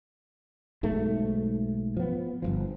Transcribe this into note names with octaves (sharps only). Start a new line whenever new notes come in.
B1 G#2 A3
F3 B3
G1 C#2 F3